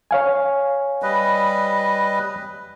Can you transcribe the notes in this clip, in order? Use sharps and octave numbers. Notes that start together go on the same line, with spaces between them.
C#5 F5 G#5
G3 B4 D#5